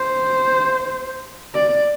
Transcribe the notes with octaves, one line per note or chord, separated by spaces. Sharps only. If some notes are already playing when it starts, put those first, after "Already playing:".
Already playing: C5
D5